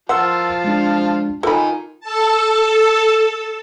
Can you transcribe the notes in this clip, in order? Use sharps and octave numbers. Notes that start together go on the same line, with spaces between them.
F3 F4 A#4 F#5 A5 C6 E6
G#3 D4
D#3 F4 A4 A#4 G#5 B5
A4 A5